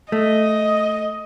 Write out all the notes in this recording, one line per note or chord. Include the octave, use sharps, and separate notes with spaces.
A3 D#5